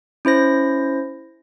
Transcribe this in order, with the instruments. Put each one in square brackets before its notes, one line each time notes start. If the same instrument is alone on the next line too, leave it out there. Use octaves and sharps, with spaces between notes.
[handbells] C#4 E4 C5 A#6